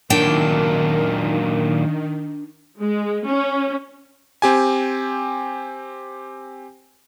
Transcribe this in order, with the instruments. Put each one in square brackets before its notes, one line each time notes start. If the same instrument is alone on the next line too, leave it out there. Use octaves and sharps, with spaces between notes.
[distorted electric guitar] A#2 F#3 [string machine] D#3 [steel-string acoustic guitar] D4 G5 [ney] A#4
[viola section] G#3
C#4
[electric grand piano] C4 G4 G#5